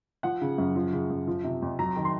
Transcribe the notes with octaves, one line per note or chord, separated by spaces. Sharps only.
F3 F#5
C#3
F#2
F3
C#3
F#2
F3
C3
F2
F#3 A#5
D#3
C6